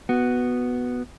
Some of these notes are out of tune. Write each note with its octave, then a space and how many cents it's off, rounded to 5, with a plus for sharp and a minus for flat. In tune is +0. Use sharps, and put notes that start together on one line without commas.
B3 +0 F#4 +0